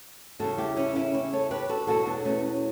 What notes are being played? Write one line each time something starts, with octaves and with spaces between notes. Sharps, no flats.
E2 C#3 G3 F#4 A4
E4 G4
C#4 E4
C#4 E4
C#4 E4
A4 C#5
G4 B4
F#4 A4
E2 B2 F#3 F#4 A4
B3 D4
A3 C#4